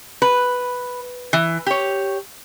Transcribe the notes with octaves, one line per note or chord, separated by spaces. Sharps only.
B4
E3
G4 C#5